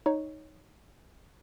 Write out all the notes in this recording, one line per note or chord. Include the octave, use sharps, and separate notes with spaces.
D#4 C#5